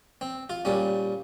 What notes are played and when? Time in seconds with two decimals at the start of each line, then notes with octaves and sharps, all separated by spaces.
0.21 C4
0.50 F4
0.65 A#2 G3 C#4